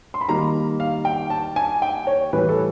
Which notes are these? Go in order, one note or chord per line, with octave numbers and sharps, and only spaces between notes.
C6
B5
D#3 G3 A#3 A#5
F5
G5
A5
G#5
G5
C#5
A2 E3 G3 B4
A4